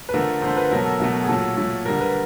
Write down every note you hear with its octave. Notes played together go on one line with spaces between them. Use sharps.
B4
D3 F3 A3 A#4
D3 F3 A3 C5
B4
B2 F#3 A3 A#4
A4
B2 F#3 A3
G#4
A#2 F#3 A3 A4
A#2 F#3 A3
D3 G3 A#4
B4